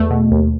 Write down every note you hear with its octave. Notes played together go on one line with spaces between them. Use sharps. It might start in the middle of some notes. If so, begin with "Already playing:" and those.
Already playing: E2 A3
B2
D#2